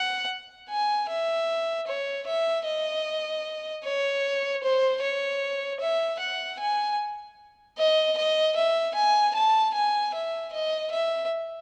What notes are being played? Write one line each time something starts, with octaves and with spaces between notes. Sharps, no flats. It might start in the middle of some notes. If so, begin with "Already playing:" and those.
Already playing: F#5
G#5
E5
C#5
E5
D#5
C#5
C5
C#5
E5
F#5
G#5
D#5
D#5
E5
G#5
A5
G#5
E5
D#5
E5